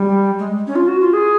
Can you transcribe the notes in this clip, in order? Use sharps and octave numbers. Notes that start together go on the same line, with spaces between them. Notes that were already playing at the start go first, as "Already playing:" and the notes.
Already playing: G3
G#3
C#4
F4
F#4
F4
G#4